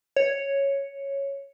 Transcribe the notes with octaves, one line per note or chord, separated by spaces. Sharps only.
C#5